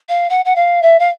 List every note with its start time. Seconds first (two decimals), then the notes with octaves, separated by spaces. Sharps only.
0.09 F5
0.30 F#5
0.45 F#5
0.56 F5
0.82 E5
0.99 F5